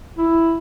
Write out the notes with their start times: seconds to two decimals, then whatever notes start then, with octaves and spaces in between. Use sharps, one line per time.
0.17 E4